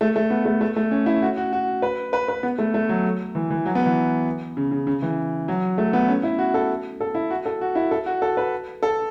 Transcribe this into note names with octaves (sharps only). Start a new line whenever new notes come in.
A3
A3
B3
A3
A3
A3
C#4
E4
F#4
F#4
F#4
B4
B4
B4
B3
A3
A3
F#3
E3
E3
F#3
B3
E3
C#3
C#3
C#3
E3
F#3
A3
B3
C#4
E4
F#4
A4
A4
E4
F#4
A4
F#4
E4
A4
F#4
A4
B4
A4